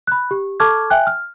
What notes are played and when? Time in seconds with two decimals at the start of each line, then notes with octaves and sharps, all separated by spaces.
0.07 B5 F#6
0.31 G4
0.60 A4 A5 C#6 D6 F6 G#6
0.90 E5 G5 G#5 F#6
1.07 F6